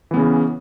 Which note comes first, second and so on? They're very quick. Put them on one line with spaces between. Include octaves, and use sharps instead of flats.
E3 B3 C#3 C#4